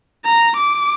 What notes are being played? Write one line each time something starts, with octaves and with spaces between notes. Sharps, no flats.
A#5
D6